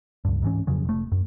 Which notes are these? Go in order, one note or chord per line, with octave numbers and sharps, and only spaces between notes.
C#2 G2
G#2 E3 C#4
F2 C#3 F#3
F1 A3
F#2